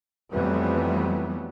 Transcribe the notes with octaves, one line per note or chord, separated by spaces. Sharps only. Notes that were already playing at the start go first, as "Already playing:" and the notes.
F2 E3 F#3 G3 A3 B3